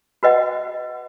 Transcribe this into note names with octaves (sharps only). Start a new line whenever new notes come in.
F#4 B4 D#5 F#5